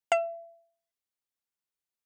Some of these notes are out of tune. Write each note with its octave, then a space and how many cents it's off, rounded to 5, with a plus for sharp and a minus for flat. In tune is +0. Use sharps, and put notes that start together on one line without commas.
E5 +35